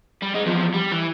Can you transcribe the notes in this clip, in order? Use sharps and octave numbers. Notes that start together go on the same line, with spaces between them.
G3
G#3 D#4
E2 F3
G3
E3